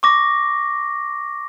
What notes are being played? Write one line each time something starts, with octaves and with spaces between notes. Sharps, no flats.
C#6 D6 A#6